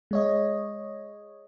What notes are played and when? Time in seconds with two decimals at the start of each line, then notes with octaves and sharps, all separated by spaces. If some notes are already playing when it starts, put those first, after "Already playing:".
0.11 G#3 C#5 D#5